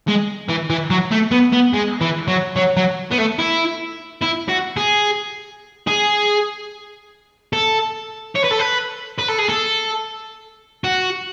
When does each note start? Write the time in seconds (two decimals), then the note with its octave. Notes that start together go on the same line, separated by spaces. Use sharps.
0.08 G#3
0.49 E3
0.70 E3
0.90 F#3
1.11 A3
1.31 B3
1.52 B3
1.73 G#3
2.01 E3
2.28 F#3
2.56 F#3
2.77 F#3
3.11 B3
3.18 A3
3.39 E4
4.22 E4
4.49 F#4
4.77 G#4
5.87 G#4
7.53 A4
8.35 C#5
8.44 B4
8.51 A4
8.59 B4
9.18 B4
9.28 A4
9.38 G#4
9.49 A4
10.84 F#4